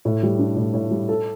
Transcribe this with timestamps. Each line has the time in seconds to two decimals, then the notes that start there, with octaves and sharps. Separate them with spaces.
0.05 A2
0.23 G3
0.39 D4
0.57 A2
0.74 A2
0.91 G3
1.08 A4